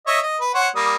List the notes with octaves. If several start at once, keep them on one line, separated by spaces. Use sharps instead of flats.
C#5 D#5 E5
D#5
B4
C5 C#5 F#5
G3 A#3 D#6